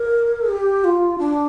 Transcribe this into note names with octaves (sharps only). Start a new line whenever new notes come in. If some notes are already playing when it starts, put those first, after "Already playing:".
Already playing: A#4
G4
F4
D4